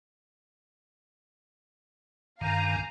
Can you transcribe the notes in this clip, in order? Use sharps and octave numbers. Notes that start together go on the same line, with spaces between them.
G2 D#3 F5 G#5 A#5